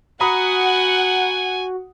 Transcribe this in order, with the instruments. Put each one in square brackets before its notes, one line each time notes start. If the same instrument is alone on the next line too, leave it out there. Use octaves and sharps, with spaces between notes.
[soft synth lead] F#4 [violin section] F#5 [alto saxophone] G#5 [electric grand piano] A#5 B5 D#6